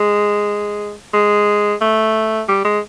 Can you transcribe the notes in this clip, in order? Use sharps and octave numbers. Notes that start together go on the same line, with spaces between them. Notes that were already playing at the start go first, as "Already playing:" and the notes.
Already playing: G#3
G#3
A3
G3
G#3